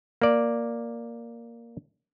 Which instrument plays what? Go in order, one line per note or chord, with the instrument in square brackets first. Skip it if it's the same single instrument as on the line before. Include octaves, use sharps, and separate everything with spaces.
[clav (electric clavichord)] A#3 D5